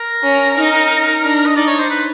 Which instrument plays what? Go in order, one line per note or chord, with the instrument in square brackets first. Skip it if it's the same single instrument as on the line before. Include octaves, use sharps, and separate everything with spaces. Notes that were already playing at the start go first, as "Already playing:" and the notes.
Already playing: [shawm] A#4
[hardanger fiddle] C#4
D#4
D4
[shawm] D#5
[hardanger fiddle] D#4 [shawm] D5
[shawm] C#5
C5
B4